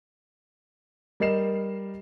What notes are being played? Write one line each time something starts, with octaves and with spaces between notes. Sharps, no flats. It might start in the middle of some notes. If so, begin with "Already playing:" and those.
G3 A#4 D#5 C7 E7